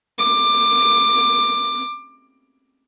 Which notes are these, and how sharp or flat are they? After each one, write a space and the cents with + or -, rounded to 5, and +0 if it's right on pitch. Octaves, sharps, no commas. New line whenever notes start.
D6 +15